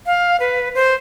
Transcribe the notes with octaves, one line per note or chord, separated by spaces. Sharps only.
F5
B4
C5